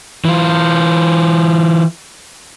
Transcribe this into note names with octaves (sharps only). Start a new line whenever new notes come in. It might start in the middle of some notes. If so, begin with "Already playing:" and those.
E3 F4